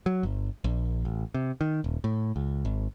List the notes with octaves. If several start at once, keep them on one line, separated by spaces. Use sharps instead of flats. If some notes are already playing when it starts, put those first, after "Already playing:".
F#3
G1
A#1
A1
C3
D#3
D#1
A2
C#2
G#1